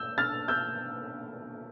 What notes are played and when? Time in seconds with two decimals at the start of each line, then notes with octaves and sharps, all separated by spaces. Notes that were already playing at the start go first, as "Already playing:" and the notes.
Already playing: E6 G6
0.18 F6 A6
0.48 E6 G6